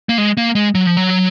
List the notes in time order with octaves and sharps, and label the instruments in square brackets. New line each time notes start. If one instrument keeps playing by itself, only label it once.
[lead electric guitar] A#3
G#3
A#3
G#3
F#3
F3
F#3